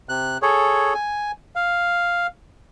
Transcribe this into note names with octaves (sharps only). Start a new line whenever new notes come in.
C3 F#6
G#4 A4 C#5
G#5
F5